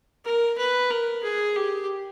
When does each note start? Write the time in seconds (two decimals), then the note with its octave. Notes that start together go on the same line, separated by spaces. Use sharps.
0.25 A#4
0.58 B4
0.90 A#4
1.23 G#4
1.56 G4